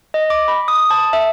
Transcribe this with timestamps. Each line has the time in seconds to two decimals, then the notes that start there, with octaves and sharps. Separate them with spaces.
0.14 D#5
0.30 D6
0.48 B5
0.68 D#6
0.91 A5
1.13 E5